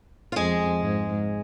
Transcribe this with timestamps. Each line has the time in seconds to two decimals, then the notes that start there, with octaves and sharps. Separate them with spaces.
0.32 F4
0.36 F2 G#3 G#4
0.82 G#2